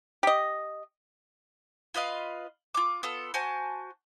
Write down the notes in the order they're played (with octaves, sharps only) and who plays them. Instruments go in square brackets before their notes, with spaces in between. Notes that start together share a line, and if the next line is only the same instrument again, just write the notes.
[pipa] G4 D#5
[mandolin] F4 B4 D#5 F5
F4 D6
B3 F4 A4
F#4 C5 G#5 A5